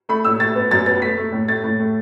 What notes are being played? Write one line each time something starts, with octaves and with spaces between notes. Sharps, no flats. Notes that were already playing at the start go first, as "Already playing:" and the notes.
A3 B5
A2 E6
A3 A6
B3
F#2 A6
B3 A6
A3 B6
A3
A2
A3 A6
A2
A3